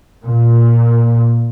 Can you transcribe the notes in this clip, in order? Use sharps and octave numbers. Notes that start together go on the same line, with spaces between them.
A#2